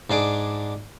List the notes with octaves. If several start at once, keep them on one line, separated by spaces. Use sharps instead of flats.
G#2 D4 G#4 D6